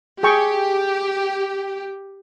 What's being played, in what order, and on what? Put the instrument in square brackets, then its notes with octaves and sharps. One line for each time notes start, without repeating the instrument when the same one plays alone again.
[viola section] G4 [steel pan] G#4 G5 C#6